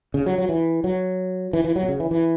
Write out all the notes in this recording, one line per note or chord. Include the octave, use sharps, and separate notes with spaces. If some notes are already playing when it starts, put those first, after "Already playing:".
C#3
F#3
F#3
E3
F#3
E3
E3
F#3
B2
C#3
E3
E3